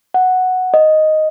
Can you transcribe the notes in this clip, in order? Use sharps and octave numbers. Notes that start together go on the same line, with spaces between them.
F#5
D#5